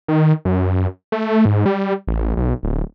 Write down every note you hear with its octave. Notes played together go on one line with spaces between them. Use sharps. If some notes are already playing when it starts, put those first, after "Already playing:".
D#3
F#2
A3
G#2
G3
A1
B1
D1